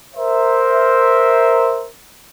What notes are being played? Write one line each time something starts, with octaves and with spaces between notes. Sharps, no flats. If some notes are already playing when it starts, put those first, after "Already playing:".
A#4 C5 E5